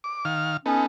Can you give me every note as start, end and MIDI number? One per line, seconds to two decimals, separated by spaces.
0.04 0.25 86
0.25 0.57 51
0.25 0.57 77
0.25 0.57 89
0.66 0.86 59
0.66 0.86 61
0.66 0.86 63
0.66 0.86 69